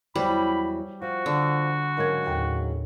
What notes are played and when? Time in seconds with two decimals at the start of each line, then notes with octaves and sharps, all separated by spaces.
0.16 E2 E3 F#3 G3 C5 B5
1.02 F3 F#4
1.26 D3
1.97 G#2 C#3 F#3 A#4 G#6
2.27 D#2 A2